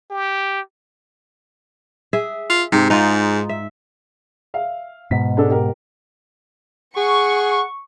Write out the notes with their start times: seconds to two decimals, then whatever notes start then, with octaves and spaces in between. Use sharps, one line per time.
0.10 G4
2.13 G#4 E5
2.50 F4
2.72 G#2 C3
2.90 G#2 D#4 F4
3.49 E5
4.54 E5 F5
5.11 G#2 B2 B6
5.37 G#3 D4 A4
5.50 G4 A#4
6.97 G#4 F#5 C#6